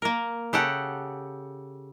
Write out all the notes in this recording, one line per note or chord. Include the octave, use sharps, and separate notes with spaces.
A#3 A#4
C#3 G4 A4 F#5